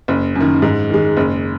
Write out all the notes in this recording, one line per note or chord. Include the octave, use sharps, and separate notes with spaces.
F#1
F#2
D#3
G#2
D#3 G#3
F#1